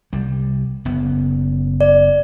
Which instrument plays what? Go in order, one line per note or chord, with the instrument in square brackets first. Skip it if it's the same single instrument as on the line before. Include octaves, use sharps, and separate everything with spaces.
[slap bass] C2 G3
F#1 B3
[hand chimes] D5